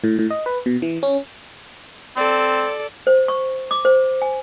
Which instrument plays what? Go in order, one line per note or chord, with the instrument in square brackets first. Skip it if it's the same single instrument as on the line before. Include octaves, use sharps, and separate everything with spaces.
[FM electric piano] A2
A2
D#5
B4
B2
E3
C#4
[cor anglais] C4 [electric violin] A4 D5
[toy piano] C5
C#6
D6
C5
G#5